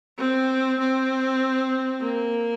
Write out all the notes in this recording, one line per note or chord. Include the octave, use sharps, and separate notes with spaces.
C4
C4
A#3